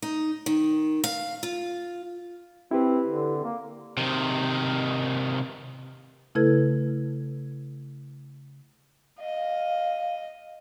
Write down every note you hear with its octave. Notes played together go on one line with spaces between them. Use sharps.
D#4
D#3
F5
F4
C4 E4 G4 B4
D3
A#3
C3 D#3
C#3 A3 E4 A4 B4 G#6
D#5 F5